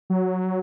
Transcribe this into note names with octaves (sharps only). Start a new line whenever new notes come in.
F#3